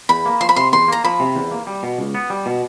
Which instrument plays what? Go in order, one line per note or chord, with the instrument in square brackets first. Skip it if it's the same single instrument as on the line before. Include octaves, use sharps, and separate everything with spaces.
[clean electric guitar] E2 [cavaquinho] B5
[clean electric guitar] A#3
[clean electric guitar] F3 [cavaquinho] C6
[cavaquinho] B5
[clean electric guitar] C3 [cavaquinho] C6
[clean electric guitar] E2 [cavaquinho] C6
[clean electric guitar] A#3 [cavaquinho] A#5
[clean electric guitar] F3 [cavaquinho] B5
[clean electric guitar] C3
E2
A#3
G3
B2
C#2
B3
G3
B2